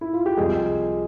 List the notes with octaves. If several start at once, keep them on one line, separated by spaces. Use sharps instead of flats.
E4
F4
G4
C2 C3 F3 G#3 G#4